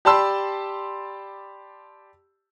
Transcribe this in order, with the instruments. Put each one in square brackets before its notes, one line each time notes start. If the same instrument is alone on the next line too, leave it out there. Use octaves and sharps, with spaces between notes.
[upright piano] G4 D5 A5 B5 C6 E6